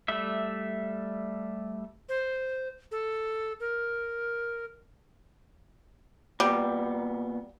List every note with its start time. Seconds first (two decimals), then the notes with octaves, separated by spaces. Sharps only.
0.08 G3 A3 E5
2.09 C5
2.91 A4
3.60 A#4
6.40 A#2 G3 B3